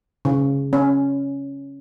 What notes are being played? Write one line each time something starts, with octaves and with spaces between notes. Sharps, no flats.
C#3
C#4